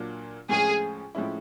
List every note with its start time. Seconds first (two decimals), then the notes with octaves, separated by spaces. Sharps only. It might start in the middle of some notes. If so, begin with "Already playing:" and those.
Already playing: A#2 F#3 A#3 D4 F4
0.49 A2 F3 G#3 C#4 F4 G#4
1.15 A2 F3 G#3 C#4 E4